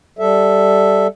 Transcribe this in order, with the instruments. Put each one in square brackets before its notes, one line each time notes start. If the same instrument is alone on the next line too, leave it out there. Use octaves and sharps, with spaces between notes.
[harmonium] G3 A4 E5